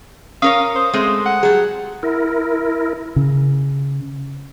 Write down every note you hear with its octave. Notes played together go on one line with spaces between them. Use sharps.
C#4 A#4 C#5 F5 D#6
C5
G#3 A3 C4
F#5
F#3 G3 G#4
E4 A#4
C#3